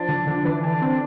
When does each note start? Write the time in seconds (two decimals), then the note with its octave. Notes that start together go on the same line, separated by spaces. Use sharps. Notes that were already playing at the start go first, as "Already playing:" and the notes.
Already playing: F3 D4
0.09 D3
0.27 D3
0.45 E3 D4
0.63 E3
0.82 C4